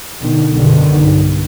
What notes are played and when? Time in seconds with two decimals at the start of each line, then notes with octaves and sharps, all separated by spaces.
0.21 B2 D3 D#3
0.53 B1 F#2 B2 D3 D#3 B3
0.96 G2